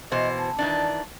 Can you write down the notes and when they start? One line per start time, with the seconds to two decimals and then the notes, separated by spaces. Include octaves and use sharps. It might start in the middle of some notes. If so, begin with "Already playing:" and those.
0.12 B2 E3 C5 D#5
0.38 A5
0.59 D#3 E3 D4